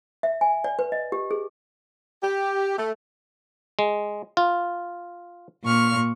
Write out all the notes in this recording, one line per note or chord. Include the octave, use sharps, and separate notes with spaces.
E5
G#5
D5
B4
D#5
G4
G#4
G4
A3
G#3
F4
A#2 C#6 F6